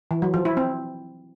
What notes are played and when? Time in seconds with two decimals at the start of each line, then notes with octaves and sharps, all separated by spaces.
0.11 E3
0.22 F#3
0.34 F3
0.45 E4
0.57 C4